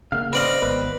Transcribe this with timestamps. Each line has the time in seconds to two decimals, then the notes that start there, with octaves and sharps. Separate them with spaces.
0.12 C#3 A#3 F5
0.33 C4 B4 D5 D#5 F5
0.62 G#1 B3 B4